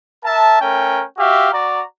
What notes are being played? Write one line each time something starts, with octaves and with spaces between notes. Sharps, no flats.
A#4 E5 A5
A3 C#4 A#4 G5
F#4 G4 E5 F5
F#4 D5 A#5